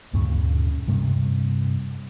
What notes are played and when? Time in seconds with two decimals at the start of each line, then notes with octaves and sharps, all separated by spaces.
0.13 D2 G2 A#2 C#3
0.87 G2 C3 G3 A#3